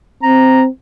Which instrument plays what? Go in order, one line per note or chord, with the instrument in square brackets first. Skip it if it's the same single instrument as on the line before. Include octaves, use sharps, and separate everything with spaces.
[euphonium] C4 [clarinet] A#5